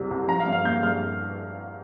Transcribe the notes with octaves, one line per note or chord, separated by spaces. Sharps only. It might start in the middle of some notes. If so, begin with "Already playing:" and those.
Already playing: C2 C3 G3
C2
F3 A#5
F5
G2
F5
A#3 G6
G2 F6